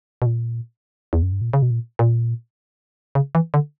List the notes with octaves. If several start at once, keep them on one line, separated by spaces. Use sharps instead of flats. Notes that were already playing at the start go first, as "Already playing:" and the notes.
B2
A#2
E2
F#2
G2
A#2
C#3
B2
A#2
A#2
C#3
E3
D3